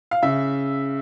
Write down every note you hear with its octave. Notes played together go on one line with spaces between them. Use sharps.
F5
C#3 E5